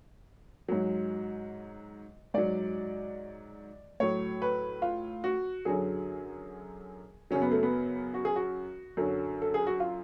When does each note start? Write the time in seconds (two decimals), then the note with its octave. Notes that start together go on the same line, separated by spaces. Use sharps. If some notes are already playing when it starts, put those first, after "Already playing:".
0.68 G#2 F#3
2.34 G#2 F#3 D5
4.00 A2 F#3 C#5
4.42 B4
4.82 F4
5.24 F#4
5.65 F#2 D3 F#3 G#4
7.31 F#2 C#3 F#3 C#4
7.42 B3
7.51 A3
7.63 B3
8.14 F#4
8.25 G#4
8.36 F#4
8.97 F#2 D3 F#3
9.42 A4
9.54 G#4
9.67 F#4
9.80 F4